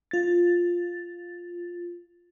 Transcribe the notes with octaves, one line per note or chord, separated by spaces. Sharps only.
F4 A6